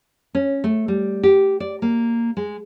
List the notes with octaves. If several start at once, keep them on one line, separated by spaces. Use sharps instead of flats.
C#4
A3
G3
G4
D5
A#3
G#3